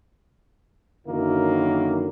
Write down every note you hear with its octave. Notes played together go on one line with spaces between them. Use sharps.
F#2 D3 D#3 F#3 A#3 E4